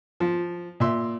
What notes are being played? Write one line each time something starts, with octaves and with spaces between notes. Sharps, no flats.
F3
A#2 E5 C6